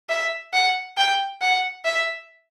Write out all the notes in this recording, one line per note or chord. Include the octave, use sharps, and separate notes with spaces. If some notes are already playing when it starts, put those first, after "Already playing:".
E5
F#5
G5
F#5
E5